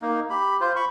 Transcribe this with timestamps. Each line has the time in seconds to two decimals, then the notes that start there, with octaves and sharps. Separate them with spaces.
0.02 A#3 D#4
0.30 G4 B5
0.61 F4 C5
0.76 B5 C#6